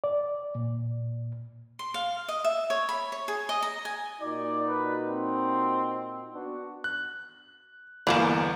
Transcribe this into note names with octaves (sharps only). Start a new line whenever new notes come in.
D5
A#2
C6
F5
D#5
E5
C#5
B5
C#5
G#4
D#5
A#5
G#5
A#2 D#4 F#4 D5
B4
C4
B3 D4 F#4
F#6
G1 E2 E3 F3 A#3 E7